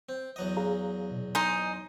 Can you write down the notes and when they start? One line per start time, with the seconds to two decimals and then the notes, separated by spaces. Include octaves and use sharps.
0.09 C4
0.36 E2 F#3 D#5
0.57 G#4 F5 A#5
1.11 B2
1.35 D#4 C5 G#5